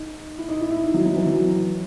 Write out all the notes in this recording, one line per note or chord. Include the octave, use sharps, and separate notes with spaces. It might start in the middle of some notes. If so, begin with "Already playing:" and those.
Already playing: D#4
E4
D#4
E4
E4
D#4
F#3
F#3
E3
F#3